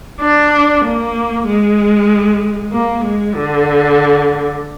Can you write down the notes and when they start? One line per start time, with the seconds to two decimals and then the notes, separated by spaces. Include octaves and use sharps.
0.21 D4
0.85 A#3
1.47 G#3
2.72 A#3
3.04 G#3
3.36 D3